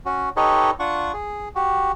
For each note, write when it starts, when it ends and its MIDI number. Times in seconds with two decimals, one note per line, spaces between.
0.06 0.29 61
0.06 0.29 66
0.37 0.70 63
0.37 0.70 67
0.37 0.70 69
0.37 0.70 71
0.37 0.70 73
0.37 0.70 75
0.80 1.12 62
0.80 1.12 65
0.80 1.12 78
0.80 1.12 85
1.13 1.49 68
1.55 1.92 66
1.55 1.92 67